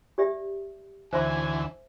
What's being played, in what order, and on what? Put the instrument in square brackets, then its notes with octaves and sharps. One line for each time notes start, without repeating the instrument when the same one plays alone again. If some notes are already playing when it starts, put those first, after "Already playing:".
[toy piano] G4 D5 E5
[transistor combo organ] D2 E3 [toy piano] C5 E5 C6 [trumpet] G#5